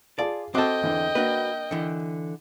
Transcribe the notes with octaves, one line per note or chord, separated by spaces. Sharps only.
F4 G#4 D5 A5
C4 F#4 A4 D#5 G5 D6 F#6
E2 D3 E3
A#3 D4 F#4 B4
D3 E3